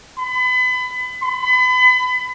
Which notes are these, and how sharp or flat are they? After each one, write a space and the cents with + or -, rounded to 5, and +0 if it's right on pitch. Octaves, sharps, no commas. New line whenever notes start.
B5 +30
B5 +35